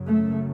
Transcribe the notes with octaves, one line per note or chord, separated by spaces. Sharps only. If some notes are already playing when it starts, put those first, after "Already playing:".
Already playing: F#2 C#3
A3